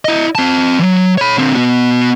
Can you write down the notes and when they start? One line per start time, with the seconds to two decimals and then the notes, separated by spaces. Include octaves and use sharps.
0.05 E4 D#5
0.35 C4 A5
0.79 E3 F#3
1.18 C#5 B5
1.38 D3 C4
1.55 B3 F#4